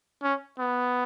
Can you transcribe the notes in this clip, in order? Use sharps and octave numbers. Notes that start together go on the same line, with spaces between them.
C#4
B3